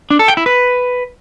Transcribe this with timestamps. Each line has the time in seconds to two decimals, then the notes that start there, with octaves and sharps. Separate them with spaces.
0.10 D4
0.19 A4
0.28 G5
0.37 E4
0.46 B4